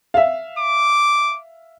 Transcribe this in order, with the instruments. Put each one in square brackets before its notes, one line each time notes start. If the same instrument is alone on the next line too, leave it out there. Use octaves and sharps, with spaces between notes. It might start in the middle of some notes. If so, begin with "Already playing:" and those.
[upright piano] E5 F5
[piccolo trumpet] D6